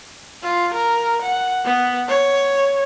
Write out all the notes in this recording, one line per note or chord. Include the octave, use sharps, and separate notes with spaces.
F4
A#4
F#5
B3
C#5